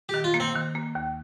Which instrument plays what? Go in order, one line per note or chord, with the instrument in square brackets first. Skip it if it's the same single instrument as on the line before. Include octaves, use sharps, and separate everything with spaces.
[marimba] D#3 [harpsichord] G4
[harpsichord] F4
[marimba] A#3
[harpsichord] C4
[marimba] D#3
A#3
D#2